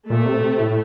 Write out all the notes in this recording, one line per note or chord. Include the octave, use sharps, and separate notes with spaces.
A#2 A3
C3
A#2
C3
A2